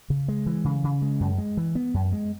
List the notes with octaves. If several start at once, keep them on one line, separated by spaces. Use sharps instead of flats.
C#3
G#3
E3
C#3
C#3
G#3
F#2
G#3
E3
B3
F#2
G#3